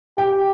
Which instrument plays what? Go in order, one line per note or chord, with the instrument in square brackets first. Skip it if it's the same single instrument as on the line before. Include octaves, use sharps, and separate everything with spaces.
[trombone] G4 [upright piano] G5